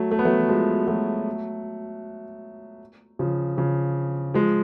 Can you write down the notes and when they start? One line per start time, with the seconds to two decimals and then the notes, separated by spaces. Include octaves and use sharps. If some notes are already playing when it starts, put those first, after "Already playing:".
Already playing: F#3 A3
0.11 A3
0.19 B3
0.25 F#3 A3
0.40 F#3
0.49 F3 G#3
0.88 F#3 A3
3.19 C#3 F3
3.57 C#3 F3
4.34 F3 G#3